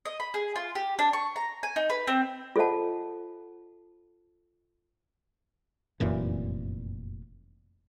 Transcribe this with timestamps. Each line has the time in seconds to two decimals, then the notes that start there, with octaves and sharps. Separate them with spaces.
0.05 D#5
0.20 B5
0.34 G#4
0.56 F4
0.75 G4
0.99 D4
1.13 C#6
1.36 A#5
1.63 G#5
1.76 D#4
1.90 B4
2.07 C4
2.56 F4 A4 C5 D#5 F#5 A5
6.00 F1 F#2 A#2 E3